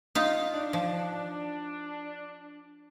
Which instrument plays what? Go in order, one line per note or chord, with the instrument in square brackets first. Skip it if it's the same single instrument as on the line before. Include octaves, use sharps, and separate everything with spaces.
[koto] D#4 F4 F5
[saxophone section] D4
[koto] F3